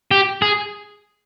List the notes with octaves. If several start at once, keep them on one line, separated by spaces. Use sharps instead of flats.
G4
G#4